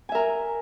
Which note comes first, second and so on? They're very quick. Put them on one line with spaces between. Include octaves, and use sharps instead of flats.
G#5 E5 A#4